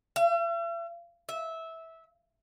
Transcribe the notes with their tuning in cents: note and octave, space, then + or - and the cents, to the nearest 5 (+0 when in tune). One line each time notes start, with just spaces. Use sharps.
E5 +45
E5 -15